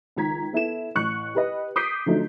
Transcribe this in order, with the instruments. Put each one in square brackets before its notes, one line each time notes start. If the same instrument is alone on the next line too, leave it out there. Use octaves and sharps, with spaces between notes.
[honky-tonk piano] C#2 D#3 A#5 G#6 B6
B3 E4 A4 E7
A1 C#6 F#6 C#7
G4 B4 D#5
D6 D#6 G6 B6 C7 D7
D3 F3 F#3 A3 D#4